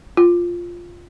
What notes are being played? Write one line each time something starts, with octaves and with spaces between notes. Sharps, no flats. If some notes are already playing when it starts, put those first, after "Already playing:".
F4